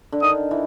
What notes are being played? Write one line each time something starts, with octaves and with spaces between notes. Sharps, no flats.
D3
D#3 D#6
E3